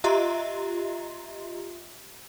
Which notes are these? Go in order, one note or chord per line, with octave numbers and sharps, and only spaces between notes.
F4 G4 D#5 E5 A#5 C6